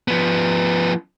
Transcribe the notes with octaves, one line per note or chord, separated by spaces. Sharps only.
F3 B3